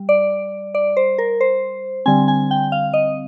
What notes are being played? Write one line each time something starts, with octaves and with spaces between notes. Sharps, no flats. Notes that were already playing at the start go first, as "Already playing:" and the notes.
Already playing: G3
D5
D5
C5
A#4
C5
D3 G3 C4 G#5
G#5
G5
F5
D#5